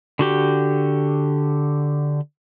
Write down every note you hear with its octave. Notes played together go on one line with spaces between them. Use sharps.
D3 F#4 G4